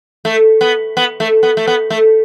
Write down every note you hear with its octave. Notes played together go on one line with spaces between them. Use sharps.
A3
B3
B3
A3
B3
A3
B3
A3